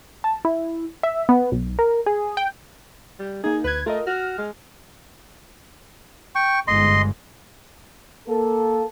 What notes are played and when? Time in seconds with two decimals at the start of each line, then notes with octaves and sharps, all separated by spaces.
0.24 A5
0.45 E4
1.03 E5
1.29 B3
1.52 B1
1.79 A#4
2.06 G#4
2.37 G5
3.20 G3
3.44 A#3 D#4 G#4
3.64 D2 B4 G#6
3.86 A3 F4 A#4 D#5
4.07 F#4 F6
4.38 G#3
6.35 G5 C#6
6.68 G1 G#2 G#3 D#5 C6
8.28 A#3 A4